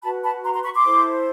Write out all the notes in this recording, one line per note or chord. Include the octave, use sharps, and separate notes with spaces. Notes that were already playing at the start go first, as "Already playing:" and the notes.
F#4 B4 A5 B5
A5 B5
A#5 C6
A#5 C6
B5 C#6
C6 D6
E4 A4 C5